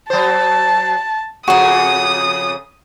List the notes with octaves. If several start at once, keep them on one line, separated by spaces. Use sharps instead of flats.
F#3 C5 A5
F2 C#3 F#4 G#4 F#5 D#6